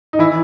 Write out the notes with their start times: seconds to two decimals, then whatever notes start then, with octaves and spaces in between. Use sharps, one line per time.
0.13 D#4
0.19 E3 E4